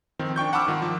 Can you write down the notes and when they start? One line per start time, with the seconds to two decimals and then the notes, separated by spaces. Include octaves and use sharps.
0.19 D#3 F3 C4
0.36 D4 G5 C#6 G6
0.53 F#5 A5 B5 D6 E6 F6
0.67 G#2 D#3 F4
0.82 F3